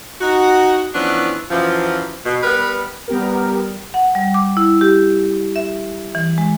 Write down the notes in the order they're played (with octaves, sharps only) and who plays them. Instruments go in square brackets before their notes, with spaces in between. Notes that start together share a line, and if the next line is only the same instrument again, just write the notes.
[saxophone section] D#4 F#4
E3 F3 B3 C#4 D4
F#2 E3 F3
B2
G3 B3 A#4 B4
[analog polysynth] G3 B3 G4 A#4
[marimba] F#5
G3
D6
E4
G4
E5
E3
G#3